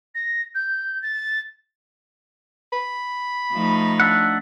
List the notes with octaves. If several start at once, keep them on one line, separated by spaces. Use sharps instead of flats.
A#6
G6
A6
B5
F3 A3 D#4
D4 E5 F#5